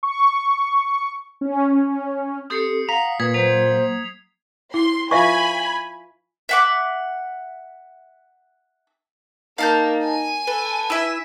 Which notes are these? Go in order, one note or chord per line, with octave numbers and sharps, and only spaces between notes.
C#6
C#4
C4 G4 A4 D#6 C7 C#7
F5 F#5 A#5 B6
A#2 B4 D#6 G#6
F#3 A#3 C5 F7
E4 C6
F4 B4 E5 F5 G#5 B5 C#6
E5 F#5 D6
A#3 D#4 F5 A5 G6
G#5
A4 B4
E4 E5